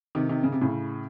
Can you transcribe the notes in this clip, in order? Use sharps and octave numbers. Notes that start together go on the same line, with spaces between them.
C3 D#3
C3 D#3
C#3
C3
A2 C#3